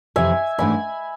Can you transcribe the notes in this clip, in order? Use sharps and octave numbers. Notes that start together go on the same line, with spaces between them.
F2 C3 E3 E5 G#5
G#2 E3 A3 D4 G#5 B5